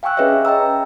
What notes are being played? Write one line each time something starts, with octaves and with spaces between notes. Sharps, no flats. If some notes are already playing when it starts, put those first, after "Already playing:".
F5 G5 G#5 C#6 E6 F#6
C#4 G#4 B4 C#5 D#5 E5
D#5 G5 A#5 E6